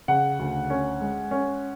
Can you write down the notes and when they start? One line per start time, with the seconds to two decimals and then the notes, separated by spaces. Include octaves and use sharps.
0.08 C#3 F#5
0.39 D2
0.70 C#4
1.01 G#3
1.31 C#4